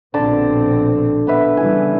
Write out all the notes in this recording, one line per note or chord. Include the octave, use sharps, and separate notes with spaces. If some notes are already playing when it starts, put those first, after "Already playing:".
A#1 B2 D3 C4 D5 A5
B3 B4 E5
C#3 E3 G3 G#5